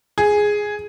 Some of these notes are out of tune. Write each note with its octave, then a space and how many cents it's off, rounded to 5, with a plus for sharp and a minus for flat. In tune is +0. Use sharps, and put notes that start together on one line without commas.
G#4 +0